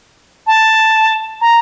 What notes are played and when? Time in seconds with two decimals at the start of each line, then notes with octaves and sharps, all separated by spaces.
0.47 A5
1.41 A#5